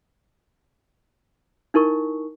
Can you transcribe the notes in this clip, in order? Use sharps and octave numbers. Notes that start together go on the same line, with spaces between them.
D#4 E4 A#4 C#6